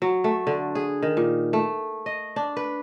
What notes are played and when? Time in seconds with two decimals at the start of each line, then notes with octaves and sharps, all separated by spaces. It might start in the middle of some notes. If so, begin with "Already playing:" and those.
0.02 F#3
0.24 A3
0.47 D3
0.75 G#4
1.02 D#3
1.17 A#2
1.53 A3
2.06 D#5
2.36 D4
2.57 B4